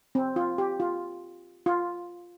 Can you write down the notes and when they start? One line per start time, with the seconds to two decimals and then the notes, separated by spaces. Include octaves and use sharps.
0.15 C4
0.36 F4
0.58 G4
0.80 F4
1.66 F4